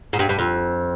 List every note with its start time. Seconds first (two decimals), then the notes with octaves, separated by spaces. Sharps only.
0.13 G#2
0.19 G2
0.29 G2
0.39 F2